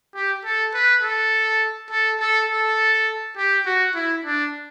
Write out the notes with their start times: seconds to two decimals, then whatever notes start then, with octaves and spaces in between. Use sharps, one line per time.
0.15 G4
0.45 A4
0.74 B4
1.03 A4
1.91 A4
2.20 A4
2.50 A4
3.37 G4
3.66 F#4
3.95 E4
4.25 D4